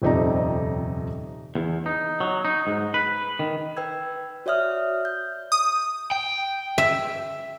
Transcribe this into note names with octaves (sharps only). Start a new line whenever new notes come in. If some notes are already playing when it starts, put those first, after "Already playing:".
D#1 F2 C3 D#4 D5 A#5
E2
D#4
F#3
D#4
G#2
B4
D#3
B4 G5 E6 G#6
F#4 C#5 D5 E5 D#6 F6
G6
D#6
G5
E5